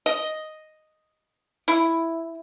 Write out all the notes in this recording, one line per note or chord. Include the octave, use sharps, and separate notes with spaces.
D#5
E4